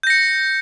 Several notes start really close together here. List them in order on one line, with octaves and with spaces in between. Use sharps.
G6 A#6 C#7